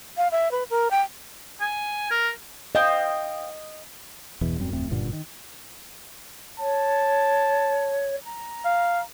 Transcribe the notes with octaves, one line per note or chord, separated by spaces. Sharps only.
F5
E5
B4
A#4
G5
G#5
A#4
C5 D#5 F5 G5
G1 E2 B2 E3
D#1 F#2 G3 C4
D1 F2 A3 C4
F#1 G2 A#2 D3
D#3
C#5 A5
A#5
F5